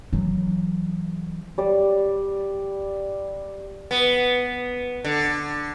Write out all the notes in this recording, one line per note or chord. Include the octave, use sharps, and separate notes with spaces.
E3 F#3
G3 D5
B3
D3